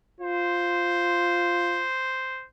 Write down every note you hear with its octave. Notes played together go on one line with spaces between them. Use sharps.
F4 C5